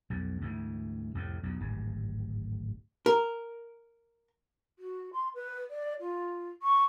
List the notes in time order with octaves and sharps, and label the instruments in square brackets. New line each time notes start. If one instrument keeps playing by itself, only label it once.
[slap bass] B1 F2
D2 G#2 E3
C2 F2 A2
B1 E2
D1 G#1 G2
[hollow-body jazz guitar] A#4
[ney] F#4
C6
B4
D5
F4
C#6